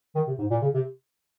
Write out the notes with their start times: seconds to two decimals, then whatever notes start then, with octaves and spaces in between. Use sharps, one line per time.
0.15 D#3
0.27 C3
0.39 G#2
0.51 A#2
0.62 C#3
0.74 C3